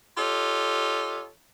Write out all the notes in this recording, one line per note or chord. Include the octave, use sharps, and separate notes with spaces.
F4 G4 A4 C#5 D#5